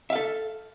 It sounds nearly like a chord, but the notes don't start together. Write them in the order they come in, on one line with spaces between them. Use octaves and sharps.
E5 F5 A4